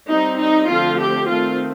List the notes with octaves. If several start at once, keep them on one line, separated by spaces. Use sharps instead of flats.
G3 C4 D#4
D#4
D3 F3 A3 C4 F4
G4
D#3 A3 C4 F4